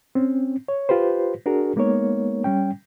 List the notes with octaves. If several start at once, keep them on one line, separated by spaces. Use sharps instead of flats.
C4 C#4
C#5
F4 G4 B4 C5
D4 F#4 G#4 A#4
G#3 A#3 B3 D#4 A#4 C#5
G3 C#4 G5